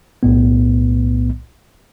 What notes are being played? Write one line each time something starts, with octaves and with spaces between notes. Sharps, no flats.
B1 A2 B3